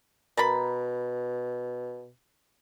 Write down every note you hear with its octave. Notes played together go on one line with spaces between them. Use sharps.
B2 A#4 A5 B5